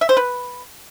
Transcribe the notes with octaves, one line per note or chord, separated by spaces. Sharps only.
E5
C5
B4